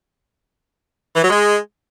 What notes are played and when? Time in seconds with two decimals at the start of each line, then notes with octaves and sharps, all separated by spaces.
1.15 E3
1.23 F#3
1.30 G#3